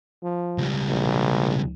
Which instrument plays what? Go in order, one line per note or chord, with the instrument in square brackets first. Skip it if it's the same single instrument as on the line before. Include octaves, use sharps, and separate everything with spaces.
[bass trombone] F3
[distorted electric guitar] C#2 G3
[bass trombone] A#1